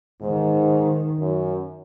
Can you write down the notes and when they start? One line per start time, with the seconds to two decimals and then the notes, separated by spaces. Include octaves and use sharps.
0.21 G#2 D#3
1.19 F#2